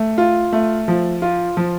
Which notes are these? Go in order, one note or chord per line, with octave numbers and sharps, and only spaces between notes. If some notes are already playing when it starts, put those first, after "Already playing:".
Already playing: A3
F4
A3
F3
F4
F3